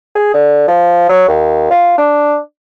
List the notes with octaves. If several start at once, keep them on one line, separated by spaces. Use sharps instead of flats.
G#4
D3
F3
F#3
D#2
F4
D4